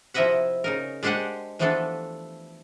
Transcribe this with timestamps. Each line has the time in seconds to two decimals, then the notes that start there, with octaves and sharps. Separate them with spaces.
0.14 C3 F3 E4 D#5 E5 F#5
0.64 C#3 D#4 A#4
1.03 G#3 D4 G4 C5 F#5 G#5
1.59 E3 F3 A3 B3 D4 A4